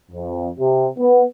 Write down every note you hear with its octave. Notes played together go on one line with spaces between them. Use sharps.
F2
C3
B3